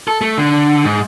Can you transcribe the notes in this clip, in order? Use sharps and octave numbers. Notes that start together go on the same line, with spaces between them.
A4
A3
D3
G#2